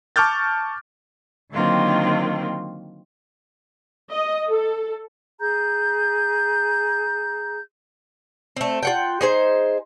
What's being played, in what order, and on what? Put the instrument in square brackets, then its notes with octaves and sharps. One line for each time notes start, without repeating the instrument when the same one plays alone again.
[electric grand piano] A5 C#6 D6 F6 G6 A6
[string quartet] D3 D#3 F#3 A#3 C4 F4
[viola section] D#5
A4
[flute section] G#4 A#5 G6
[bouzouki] A3 C4
F4 F#5 G5
D#4 G#4 C5